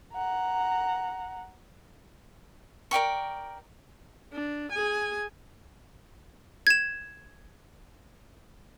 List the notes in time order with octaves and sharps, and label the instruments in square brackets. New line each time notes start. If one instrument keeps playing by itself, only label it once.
[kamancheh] F#5 A#5
[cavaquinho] A#4 D5 G5 C#6
[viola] D4
G#4 G#5
[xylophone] G#6 E7